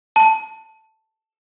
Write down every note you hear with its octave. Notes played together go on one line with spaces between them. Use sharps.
A5